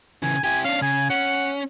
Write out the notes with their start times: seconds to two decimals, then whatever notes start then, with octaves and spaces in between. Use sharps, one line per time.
0.23 C#3 E3 G#5
0.44 E4 G4 G#5
0.65 C#4 D4 F5
0.82 C#3 G#5
1.10 C#4 F#5